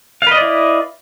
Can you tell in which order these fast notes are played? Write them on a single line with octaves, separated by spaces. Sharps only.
F5 B4 D#5 D5 E4